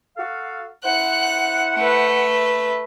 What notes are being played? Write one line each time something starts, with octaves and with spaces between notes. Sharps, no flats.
F#4 A4 F5
E4 C5 F#5 F#6
A3 B4